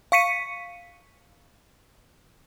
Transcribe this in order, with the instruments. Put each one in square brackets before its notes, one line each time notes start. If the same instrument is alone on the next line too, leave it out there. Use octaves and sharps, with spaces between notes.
[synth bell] F5 C#6 B6 C#7 D#7